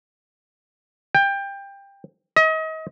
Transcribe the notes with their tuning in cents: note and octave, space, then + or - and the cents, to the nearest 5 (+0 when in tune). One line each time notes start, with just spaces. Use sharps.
G5 +20
D#5 +35